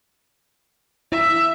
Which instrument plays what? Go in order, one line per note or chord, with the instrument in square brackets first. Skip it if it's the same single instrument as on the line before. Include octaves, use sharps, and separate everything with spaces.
[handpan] E4 [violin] E5